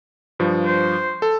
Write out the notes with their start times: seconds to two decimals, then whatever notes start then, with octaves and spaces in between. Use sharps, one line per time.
0.39 G2 F3
0.66 C5
1.22 A4